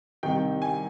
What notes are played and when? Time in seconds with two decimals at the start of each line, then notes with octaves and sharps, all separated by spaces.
0.23 C2 C3 D#3 G5
0.62 G#5